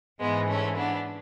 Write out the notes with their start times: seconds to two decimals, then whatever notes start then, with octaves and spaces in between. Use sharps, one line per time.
0.20 G#2 E3 G#3 B3
0.48 A3 C#4
0.76 B3 D4